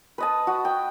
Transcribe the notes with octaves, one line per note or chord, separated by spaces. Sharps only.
B4 D#5 A5
F#4
G5